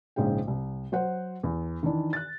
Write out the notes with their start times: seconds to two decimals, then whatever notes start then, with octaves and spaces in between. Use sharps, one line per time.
0.16 A#1 G#2 C#3 G#3 G5
0.47 C2
0.92 F#3 C5 F#5
1.43 E2
1.83 D#3 E3 D4
2.13 F#6 A6